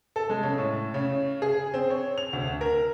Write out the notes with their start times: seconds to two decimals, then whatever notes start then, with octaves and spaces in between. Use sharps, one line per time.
0.16 A4
0.30 G#3
0.43 C#3
0.58 A2
0.94 C#3
1.42 G#4
1.74 C4
1.90 C#5
2.18 F7
2.33 D2
2.61 A#4